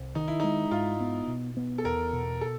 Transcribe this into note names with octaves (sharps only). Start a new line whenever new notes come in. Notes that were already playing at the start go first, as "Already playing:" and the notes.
Already playing: C2
D#3 D#4
E4
G#3 D#4
G#2 F4
B3
B2
B3
A4
E2 A#4
B2
A4